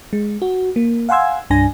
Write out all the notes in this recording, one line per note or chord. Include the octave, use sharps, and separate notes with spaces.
G#3
F#4
A#3
F5 F#5 G#5 C6 E6 G#6
C2 G2 D4 G#5 A#6